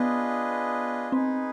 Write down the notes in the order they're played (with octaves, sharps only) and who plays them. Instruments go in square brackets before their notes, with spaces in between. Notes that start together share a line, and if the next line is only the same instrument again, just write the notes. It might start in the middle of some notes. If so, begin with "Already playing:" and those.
Already playing: [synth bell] B3 [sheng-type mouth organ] D4 F4 G#4 B4 D#5
[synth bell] C4 [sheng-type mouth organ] D#4 G#4 B4